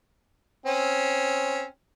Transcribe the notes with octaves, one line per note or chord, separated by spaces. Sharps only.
C4 C#4